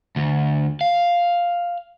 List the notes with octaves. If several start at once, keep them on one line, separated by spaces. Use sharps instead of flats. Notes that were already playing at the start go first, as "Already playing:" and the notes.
D2
F5